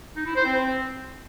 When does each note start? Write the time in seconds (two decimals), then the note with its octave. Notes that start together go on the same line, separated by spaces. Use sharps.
0.16 D#4
0.26 E4
0.36 C5
0.46 C4